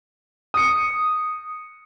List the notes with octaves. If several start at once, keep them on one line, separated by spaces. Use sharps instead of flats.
D#6 C#7